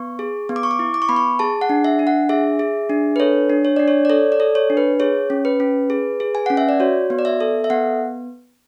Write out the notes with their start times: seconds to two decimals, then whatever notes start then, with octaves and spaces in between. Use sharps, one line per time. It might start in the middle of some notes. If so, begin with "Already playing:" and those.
Already playing: B3 C#6
0.19 G#4
0.49 B3
0.56 D6
0.63 C#6
0.71 D6
0.79 E4
0.94 D6
1.02 C#6
1.09 B3 B5
1.16 C#6
1.39 G#4 A5
1.61 F#5
1.70 D4
1.85 E5
1.99 D4
2.07 F#5
2.29 G#4 E5
2.59 G#4
2.90 D4
3.16 B4
3.20 A4 C#5
3.50 D4
3.65 C#5
3.76 D4 D5
3.88 C#5
4.05 D5
4.10 A4 C#5
4.32 D5
4.40 A4
4.55 C#5
4.70 D4
4.77 B4
5.00 G#4 C#5
5.30 C#4
5.45 B4
5.60 C#4
5.90 G#4
6.20 G#4
6.35 G#5
6.46 C#4 F#5
6.57 E5
6.69 D5
6.80 F#4 C#5
7.10 B3
7.19 D5
7.25 E5
7.40 A4
7.64 E5
7.70 B3 F#5